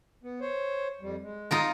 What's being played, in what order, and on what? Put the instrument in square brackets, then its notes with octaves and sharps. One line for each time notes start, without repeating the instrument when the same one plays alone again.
[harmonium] B3
C5 C#5
F2 G3
G#3
[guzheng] D#4 F4 A#4